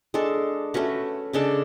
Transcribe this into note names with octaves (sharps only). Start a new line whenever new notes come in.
G#3 D4 A4
A3 C#4 F#4 B4
C#3 G#3 D4 A4